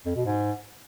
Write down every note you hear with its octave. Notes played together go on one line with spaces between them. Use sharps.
F2
B2
G#2